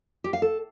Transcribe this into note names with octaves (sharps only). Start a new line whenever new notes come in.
G4
F5
A4